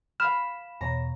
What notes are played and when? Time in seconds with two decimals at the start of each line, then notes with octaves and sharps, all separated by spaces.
0.20 F5 B5 F6 E7
0.81 E2 B2 C#5 A#5